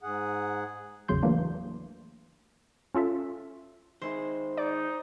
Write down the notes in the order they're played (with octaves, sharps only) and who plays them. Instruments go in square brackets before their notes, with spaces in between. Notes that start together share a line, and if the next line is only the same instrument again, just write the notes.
[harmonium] G#2 G#4 F#5
[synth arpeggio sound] G#1 E2 C#3 F#3 C6 G6
E3 F#3 A3 A#3 D4
C#4 F4 A4 E5
[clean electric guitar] D#3 G#3 E4 [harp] C5
[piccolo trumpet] D#4 [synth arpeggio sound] D5